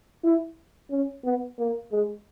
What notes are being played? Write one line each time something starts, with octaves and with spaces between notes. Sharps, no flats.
E4
C#4
B3
A#3
G#3